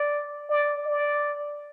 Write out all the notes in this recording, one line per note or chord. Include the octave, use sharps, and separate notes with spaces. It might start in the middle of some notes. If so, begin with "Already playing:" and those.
Already playing: D5
D5
D5